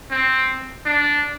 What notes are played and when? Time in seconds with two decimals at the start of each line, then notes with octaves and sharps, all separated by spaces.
0.11 C4
0.86 D4